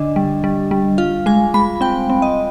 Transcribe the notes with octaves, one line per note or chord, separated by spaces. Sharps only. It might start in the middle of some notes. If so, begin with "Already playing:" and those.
Already playing: D3 D4 D#5
G3
G3
G3
F4 F5
G#3 G#5
G#3 B5
C4 G5
C4
D#5